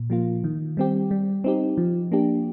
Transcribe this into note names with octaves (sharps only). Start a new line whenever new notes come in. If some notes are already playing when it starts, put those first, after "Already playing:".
Already playing: A#2
F3 A#3 F4
D#3
G3 C4 G4
G3
C4 D#4 G4
F3
A#3 D4 G4